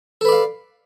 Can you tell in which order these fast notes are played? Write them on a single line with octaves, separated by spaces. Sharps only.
A4 B4 D5 F5